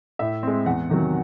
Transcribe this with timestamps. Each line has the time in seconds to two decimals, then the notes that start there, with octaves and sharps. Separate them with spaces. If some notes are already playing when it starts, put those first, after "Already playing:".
0.19 A2 E5
0.43 G#3 C4
0.66 E2 F#5
0.89 C3 D#3 F#3